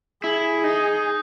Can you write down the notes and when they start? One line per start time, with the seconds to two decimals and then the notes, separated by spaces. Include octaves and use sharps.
0.24 E4 G#4
0.64 D#4